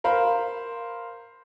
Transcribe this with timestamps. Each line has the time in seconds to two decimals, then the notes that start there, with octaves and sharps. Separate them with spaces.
0.04 A#4 C5 F5 B5